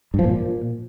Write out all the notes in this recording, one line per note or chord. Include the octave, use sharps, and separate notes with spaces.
G2
F3
A#2